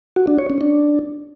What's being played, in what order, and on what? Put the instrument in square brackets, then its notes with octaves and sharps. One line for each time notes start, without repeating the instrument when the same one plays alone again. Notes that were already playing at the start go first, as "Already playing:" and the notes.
[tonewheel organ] F#4
D4
C#5
C#4
D4